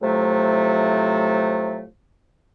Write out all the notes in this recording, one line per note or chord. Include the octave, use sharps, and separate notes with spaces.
A2 C3 F3 F#3 A3